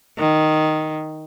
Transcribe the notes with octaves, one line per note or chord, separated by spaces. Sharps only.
D#3